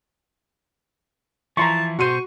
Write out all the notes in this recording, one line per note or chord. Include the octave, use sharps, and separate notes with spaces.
E3 F3 E4 A5 A#5 C6 C#6
B2 F#4 C5 C6 C#6 D#7